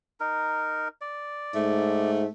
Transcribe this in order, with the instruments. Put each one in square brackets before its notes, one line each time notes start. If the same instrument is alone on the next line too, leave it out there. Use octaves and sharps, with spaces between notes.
[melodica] D#4 A#4
D5
[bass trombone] G#2 [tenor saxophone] A3